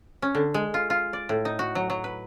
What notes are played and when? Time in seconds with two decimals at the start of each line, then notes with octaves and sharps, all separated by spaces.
0.22 C#4
0.35 D3
0.54 G#3
0.74 F4
0.90 F4
1.13 D5
1.29 A2
1.45 D#4
1.59 F#4
1.75 F#3
1.90 F#3
2.04 B4